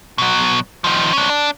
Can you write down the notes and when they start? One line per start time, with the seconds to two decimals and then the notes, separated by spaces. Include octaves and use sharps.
0.18 B2 F#3
0.84 D#3 F3
1.13 C#4 D4
1.29 D4